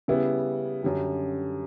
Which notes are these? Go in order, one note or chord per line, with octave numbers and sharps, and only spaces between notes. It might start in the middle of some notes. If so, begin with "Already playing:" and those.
C#3 G3 B3 E4
F#2 D3 G3